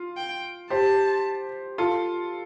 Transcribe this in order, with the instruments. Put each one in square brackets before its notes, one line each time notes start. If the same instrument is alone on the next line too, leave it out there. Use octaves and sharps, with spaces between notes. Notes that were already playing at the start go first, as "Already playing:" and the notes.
Already playing: [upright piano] F4
[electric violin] G5
[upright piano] G4 C5 [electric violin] A5
[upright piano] F4 A4